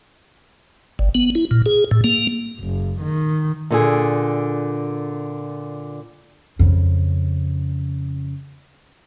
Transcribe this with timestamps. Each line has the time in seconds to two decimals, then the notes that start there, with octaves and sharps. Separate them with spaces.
0.99 G1
1.15 B3
1.35 E4
1.51 A#2
1.66 G#4
1.91 A2
2.04 A#3
2.60 F#1
3.01 D#3
3.71 A#2 D3 G#4
6.59 F2 C#3